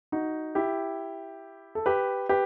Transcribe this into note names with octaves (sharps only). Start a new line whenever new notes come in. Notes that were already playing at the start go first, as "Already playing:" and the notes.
D#4 F#4
E4 G4
A4
G4 B4
G4 B4